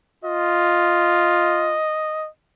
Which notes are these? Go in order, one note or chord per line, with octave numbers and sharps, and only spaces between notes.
F4 D#5